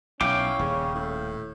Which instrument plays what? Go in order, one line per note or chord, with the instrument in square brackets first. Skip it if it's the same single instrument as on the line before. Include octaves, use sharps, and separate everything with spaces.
[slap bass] B1 [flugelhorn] C#4 [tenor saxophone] E4 [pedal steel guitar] F5 G5 D6
[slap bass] D#1 [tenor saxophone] C#3
[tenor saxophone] A2